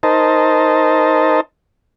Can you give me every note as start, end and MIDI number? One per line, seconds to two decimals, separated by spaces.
0.03 1.41 63
0.03 1.41 70
0.03 1.41 72
0.03 1.41 75
0.03 1.41 81